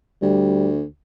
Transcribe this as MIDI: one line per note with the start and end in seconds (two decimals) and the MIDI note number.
0.22 0.83 38
0.22 0.70 55